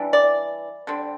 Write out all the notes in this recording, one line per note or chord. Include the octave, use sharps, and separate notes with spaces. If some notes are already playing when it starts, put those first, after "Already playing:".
Already playing: E3 G3 D4
D5
D3 G3 C4